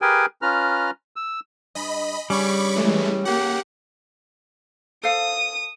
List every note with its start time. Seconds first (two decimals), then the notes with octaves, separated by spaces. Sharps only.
0.01 G4 G#4 A#4 B4 G5 G#5
0.42 C#4 F4 B4 A#5 F6
1.16 E6
1.75 G2 D#5 B5
2.30 G2 C#3 G3 C#4 B5 C#6 D6
2.76 E3 G#3 A3
3.25 A#3 G4 F#5
5.03 A4 C5 F5 D#6